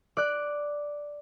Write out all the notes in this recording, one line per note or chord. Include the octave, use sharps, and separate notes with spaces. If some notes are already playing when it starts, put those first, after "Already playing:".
D5 F#6